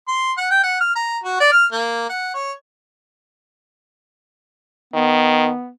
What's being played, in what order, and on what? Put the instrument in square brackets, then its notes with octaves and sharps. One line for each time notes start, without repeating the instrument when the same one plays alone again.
[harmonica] C6
F#5
G5
F#5
F6
A#5
F#4
D5
F6
A#3
F#5
C#5
[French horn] D#3 [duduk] B3